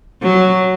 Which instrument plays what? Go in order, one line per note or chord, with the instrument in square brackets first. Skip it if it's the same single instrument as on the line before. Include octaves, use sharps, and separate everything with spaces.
[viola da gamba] F#3